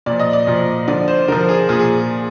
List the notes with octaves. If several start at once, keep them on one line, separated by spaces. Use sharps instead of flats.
A#2 F3 D5
D#5
D5
A#2 F3
D3 F3 D5
C5
D3 F3 A#4
G#4
A#2 F3 G#4
G#4